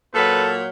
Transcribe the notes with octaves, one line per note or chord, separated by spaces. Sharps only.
A#2 F#3 A4 B4